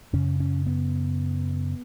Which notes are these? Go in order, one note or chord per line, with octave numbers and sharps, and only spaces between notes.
F#2 C#3 C#4
C#4
B3